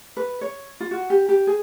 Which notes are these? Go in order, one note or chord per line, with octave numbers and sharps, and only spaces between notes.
B4
C#5
F4
F#4
G4
G4
G#4